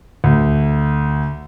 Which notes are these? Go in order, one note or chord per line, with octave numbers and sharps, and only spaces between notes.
D2